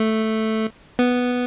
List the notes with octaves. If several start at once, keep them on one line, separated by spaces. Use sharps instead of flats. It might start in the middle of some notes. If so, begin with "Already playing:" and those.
Already playing: A3
B3